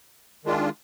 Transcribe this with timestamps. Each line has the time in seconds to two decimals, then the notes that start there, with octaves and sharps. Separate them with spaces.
0.45 D#3 G#3 D4 F4